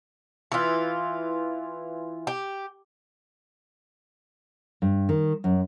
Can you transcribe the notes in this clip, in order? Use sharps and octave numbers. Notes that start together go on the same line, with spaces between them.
E3 F4
G4
G2
D#3
F#2